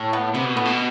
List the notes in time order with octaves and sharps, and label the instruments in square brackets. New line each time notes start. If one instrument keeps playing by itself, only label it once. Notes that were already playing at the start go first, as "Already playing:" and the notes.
Already playing: [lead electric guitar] A2
[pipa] B3
[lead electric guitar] C3 [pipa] B3
[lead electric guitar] B2
[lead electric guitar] A2 [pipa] B3
[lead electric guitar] B2